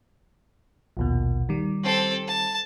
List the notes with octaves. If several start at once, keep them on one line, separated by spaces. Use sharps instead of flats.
A#1 D#2 B2
D#3 G3
C4 A4
A5